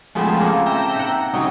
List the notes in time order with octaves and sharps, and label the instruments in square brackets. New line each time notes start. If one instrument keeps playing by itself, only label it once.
[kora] C#3 B3 C4 [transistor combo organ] F3 G#3 A3
[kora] A#3 A4
[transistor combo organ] E5 G5 A#5
[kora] D#4 F#5
[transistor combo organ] C#3 G3 D#4 [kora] F#3